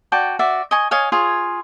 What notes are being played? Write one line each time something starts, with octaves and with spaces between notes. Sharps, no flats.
F#4 D5 G5 A5
F#4 D5 E5
D#5 G#5 C#6
C#5 D#5 F5 G#5
F4 G#4 C#5